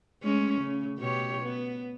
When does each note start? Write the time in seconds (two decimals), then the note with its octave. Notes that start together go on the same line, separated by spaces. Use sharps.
0.23 G#3 A3 C#4
0.61 C#3
0.98 B2 G4 C#5
1.42 B3